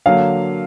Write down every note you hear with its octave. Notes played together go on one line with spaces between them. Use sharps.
D3 F#3 A#3 F5